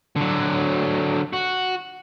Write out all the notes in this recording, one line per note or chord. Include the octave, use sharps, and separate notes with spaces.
D3 F#3
F#4